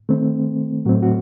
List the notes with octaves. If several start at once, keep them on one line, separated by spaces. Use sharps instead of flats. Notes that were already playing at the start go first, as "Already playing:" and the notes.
D#3 A3 C4
A2 F#3 A3 C4 F#4
F#4